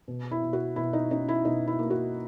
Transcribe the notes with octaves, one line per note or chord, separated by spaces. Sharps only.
B2
E4
B2
F#4
B2 E4
D#4
C#4 D#4
E4
B2 D#4
E4
A#3
F#4